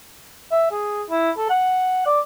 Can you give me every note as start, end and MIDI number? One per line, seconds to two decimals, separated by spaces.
0.52 0.67 76
0.71 1.03 68
1.10 1.31 64
1.38 1.47 69
1.50 2.04 78
2.06 2.20 74